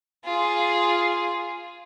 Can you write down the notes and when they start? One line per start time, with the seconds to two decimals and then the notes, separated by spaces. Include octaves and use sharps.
0.25 F4 G#4